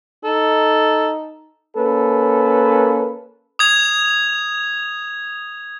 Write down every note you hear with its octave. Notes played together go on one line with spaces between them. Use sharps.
D#4 A4
A#3 C#4 A4 B4
D#6 G#6 F7